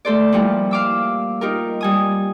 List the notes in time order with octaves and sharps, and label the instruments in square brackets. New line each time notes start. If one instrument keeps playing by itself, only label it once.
[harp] A3 A4 C5 D5
A#2 F3 G3 E4
F5 D6 E6
D#4 F4 G4 A#4
G3 G#5 D#6